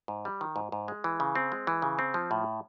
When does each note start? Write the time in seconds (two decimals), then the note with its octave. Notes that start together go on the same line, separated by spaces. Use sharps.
0.08 G#2
0.25 G3
0.41 D#3
0.56 G#2
0.72 G#2
0.88 G#3
1.04 E3
1.20 C#3
1.35 C4
1.52 G#3
1.67 E3
1.82 C#3
1.99 C4
2.14 F3
2.31 A2